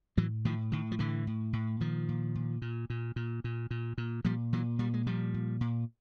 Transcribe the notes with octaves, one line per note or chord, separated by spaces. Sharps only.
A2 E3 F#3
A2 D#3 F3
A2 D#3
F3
A2 D3 E3
A2
A2
A#2 D#3 F3
A#2
A#2
A#2
A#2
A#2
A#2
A#2
A#2
A#2 F3 G3
A#2 E3 F#3
A#2 G3
G#3
A#2 F3 G3
A#2
A#2